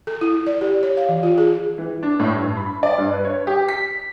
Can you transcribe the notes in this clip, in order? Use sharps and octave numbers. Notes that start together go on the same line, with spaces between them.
A4
E4
D5
G4
C#5
F5
E3
F4
G#4
E3
D4
A2
G2
B5
D5
G2
B4
C#5
G4
B6